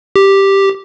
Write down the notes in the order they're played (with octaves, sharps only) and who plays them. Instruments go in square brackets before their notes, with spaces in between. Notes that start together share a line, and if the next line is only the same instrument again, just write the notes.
[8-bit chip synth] G4